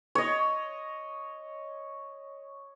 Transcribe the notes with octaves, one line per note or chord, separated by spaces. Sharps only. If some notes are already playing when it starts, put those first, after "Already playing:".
C#5 D#5